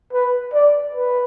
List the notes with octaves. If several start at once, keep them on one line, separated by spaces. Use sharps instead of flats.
B4
D5
B4